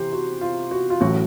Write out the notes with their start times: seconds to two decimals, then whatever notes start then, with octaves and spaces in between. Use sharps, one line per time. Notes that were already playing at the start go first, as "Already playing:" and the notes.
Already playing: C3 E3 G4 C5
0.12 F#4
0.41 F4
0.71 F#4
0.90 F4
1.00 A1 A2 F#3 F#4